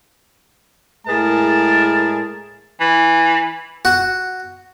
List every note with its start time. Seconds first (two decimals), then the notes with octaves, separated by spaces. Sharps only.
1.07 A2 G#3 G#4 A#4 A5
2.80 E3
3.85 F#4